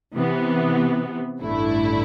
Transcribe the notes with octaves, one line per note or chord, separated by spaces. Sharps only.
C3 E3 B3
A1 G2 D3 A3 E4